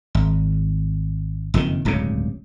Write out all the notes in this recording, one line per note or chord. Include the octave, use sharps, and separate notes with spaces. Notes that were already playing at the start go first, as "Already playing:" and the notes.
G#1
F#1 F2 D3 D#3
D1 C#2 G2 C#3